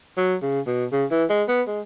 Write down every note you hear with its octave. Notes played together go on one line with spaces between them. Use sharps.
F#3
C#3
B2
C#3
E3
G#3
B3
G#3